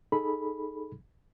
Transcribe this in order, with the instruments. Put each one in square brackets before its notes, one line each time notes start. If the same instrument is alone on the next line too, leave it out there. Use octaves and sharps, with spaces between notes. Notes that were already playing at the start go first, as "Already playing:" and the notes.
[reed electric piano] D#4 G#4 A4 B5